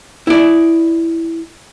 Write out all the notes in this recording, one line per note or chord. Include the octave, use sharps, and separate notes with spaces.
E4 D5